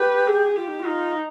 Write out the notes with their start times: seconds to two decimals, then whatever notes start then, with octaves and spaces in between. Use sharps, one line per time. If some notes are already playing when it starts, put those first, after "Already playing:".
Already playing: G4 B4
0.27 G#4
0.56 F4 G4
0.68 D#4
0.80 F4
0.86 D#4